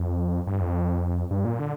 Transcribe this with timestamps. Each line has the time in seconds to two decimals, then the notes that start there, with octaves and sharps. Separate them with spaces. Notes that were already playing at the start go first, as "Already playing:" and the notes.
Already playing: F2
0.47 G2
0.61 F2
1.31 G2
1.45 A#2
1.59 D3